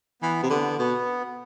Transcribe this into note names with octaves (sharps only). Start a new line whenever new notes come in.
E3 B3
C3
D3 B3
B2 B3